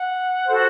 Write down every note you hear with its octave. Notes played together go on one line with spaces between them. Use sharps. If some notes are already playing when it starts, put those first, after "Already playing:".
Already playing: F#5
F#4 A4 C5